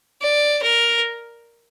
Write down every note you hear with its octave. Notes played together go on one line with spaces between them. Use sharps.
D5
A#4